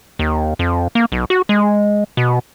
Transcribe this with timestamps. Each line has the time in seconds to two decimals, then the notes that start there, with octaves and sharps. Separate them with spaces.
0.19 D#2
0.59 F2
0.95 A#3
1.12 B1
1.30 F#4
1.49 G#3
2.17 B2